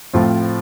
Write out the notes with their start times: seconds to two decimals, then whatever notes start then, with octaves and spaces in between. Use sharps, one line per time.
0.13 A2 F3 C4 F4